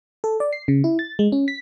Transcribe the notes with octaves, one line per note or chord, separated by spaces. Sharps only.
A4
D5
C7
C#3
E4
A6
G#3
C#4
B6